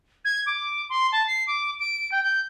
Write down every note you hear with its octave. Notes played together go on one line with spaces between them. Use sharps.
G#6
D6
C6
A5
C7
D6
D7
G5
G6